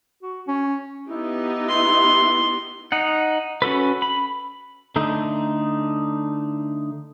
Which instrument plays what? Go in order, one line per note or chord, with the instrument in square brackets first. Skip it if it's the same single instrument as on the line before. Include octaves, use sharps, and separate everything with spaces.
[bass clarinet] F#4
C#4
[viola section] B3 D#4 G4 [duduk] E4
[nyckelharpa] C6
[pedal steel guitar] D#4 F#5
C#4 F#4 A4 B4
B5
[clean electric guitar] D3 A3 D#4